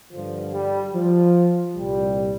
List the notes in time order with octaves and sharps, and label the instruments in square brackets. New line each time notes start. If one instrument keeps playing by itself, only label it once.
[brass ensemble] G2 D3 F3
G3
F3
C2 A#2 G3